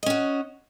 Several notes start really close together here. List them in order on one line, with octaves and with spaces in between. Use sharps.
D#5 C#4 F#4